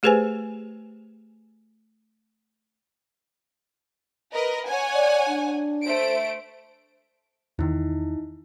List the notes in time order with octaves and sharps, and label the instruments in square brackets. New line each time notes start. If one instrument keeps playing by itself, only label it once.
[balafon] A3 G4 G#4 B4 C5 G#5
[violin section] A#4 B4 D#5
C#5 F#5 G#5
[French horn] D5
D4
[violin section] A3 C5 D7
[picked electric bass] E2 D#3 [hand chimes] D#4 E4